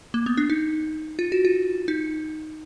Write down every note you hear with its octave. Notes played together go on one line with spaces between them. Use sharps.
A#3
B3
D4
D#4
F4
F#4
F4
D#4